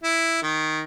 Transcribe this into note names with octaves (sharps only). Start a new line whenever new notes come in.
E4
D#3